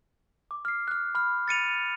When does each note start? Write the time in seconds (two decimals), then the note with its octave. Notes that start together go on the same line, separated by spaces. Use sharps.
0.51 D6
0.65 F6 C7
0.88 F6 F#6
1.15 B5 F6
1.48 A6 C#7 D#7 F7